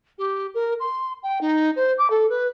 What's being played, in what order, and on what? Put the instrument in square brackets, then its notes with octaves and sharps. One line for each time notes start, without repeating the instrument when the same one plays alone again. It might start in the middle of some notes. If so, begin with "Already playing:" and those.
[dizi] G4
A#4
C6
G5
D#4
C5
D6
A4
B4